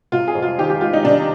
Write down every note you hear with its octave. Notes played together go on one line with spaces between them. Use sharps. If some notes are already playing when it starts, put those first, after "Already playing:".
C3 F4
G#4
F2
F4
D#3 G4
G4
G#3 F4
D#4
C3 D4